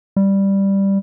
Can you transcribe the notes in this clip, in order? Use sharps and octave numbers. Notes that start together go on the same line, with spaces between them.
G3